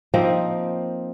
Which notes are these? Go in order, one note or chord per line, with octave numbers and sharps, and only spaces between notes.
F3 A#3 C4 D#4